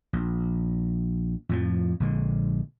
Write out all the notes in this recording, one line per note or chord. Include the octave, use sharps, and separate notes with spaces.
A#1
F2 A2 F3
A#1 D3 G#3